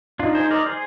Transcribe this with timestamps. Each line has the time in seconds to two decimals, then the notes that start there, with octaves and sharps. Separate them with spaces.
0.19 D4 D#4 F4
0.35 G#4 C5
0.51 A#4 D5
0.66 G#4 C5